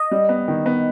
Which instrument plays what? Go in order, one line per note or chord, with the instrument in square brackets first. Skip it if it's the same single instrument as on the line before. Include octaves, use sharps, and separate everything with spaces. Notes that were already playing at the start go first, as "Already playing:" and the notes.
Already playing: [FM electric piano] D#5
[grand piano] G3
B3
D#3
B3